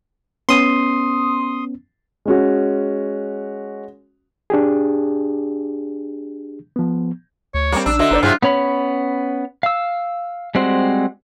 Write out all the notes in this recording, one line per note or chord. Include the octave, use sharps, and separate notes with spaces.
B3 C#4 C6 D#6
G#3 C#4 F#4
D4 G4 G#4
F3 B3
D2 C#5
G3 A#3 C4
A#1 D4 E6
D3 F#4 D#5 E5
G1 D#4 C5 D5
G2 C3 F#3 E4 F4 G#4
B3 C#4 C#5 B5
F5 E6
G3 G#3 C4 F#4 C5